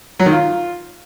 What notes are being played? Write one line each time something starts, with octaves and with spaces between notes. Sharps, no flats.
F#3
D#3
F4